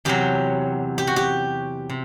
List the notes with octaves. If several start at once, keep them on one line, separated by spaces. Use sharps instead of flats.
E2 C3 F#3 G4
G4
F#4
G4
C3